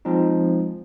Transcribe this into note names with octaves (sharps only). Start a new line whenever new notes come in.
F3 G#3 C4 D#4